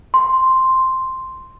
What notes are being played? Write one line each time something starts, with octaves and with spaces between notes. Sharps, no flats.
C6